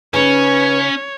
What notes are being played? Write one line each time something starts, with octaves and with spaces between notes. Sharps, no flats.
C#3 C#4 D#4 B4 C#5